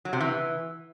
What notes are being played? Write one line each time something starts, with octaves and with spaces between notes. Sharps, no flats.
F#3
C3
E3